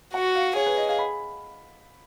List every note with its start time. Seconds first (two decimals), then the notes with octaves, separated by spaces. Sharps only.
0.14 F#4 F#5
0.35 F5
0.56 G#4 C#5
0.66 B4
0.78 D#5
0.88 F5
0.99 B5